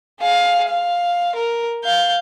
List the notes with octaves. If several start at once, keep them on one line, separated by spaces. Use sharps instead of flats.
G#4 F5
F5
A#4
F5 G6